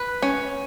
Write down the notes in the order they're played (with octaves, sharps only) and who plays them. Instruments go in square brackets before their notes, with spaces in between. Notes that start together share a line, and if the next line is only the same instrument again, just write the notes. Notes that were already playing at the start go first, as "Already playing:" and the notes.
Already playing: [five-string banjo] B4
C#4